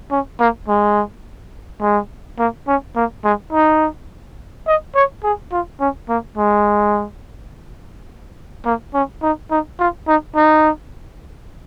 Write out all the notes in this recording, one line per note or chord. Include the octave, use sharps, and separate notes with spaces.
C#4
A#3
G#3
G#3
A#3
C#4
A#3
G#3
D#4
D#5
C#5
G#4
F4
C#4
A#3
G#3
A#3
C#4
D#4
D#4
F4
D#4
D#4